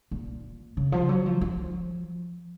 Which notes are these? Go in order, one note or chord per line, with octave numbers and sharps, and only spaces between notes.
A#2
C#3
F3
F#3
F3
F3